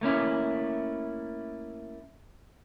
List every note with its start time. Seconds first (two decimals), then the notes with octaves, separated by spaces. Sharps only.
0.01 A3 A#3 C#4 E4